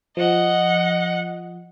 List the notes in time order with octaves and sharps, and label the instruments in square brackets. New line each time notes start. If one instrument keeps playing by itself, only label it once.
[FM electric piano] F3 [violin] D#5 F#5